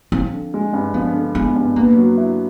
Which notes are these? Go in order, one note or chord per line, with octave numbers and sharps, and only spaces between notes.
F3 C4
D3
G#3
G2
F3 B3
D3
G#3 B3
G2
A#3 B3
F#3
E4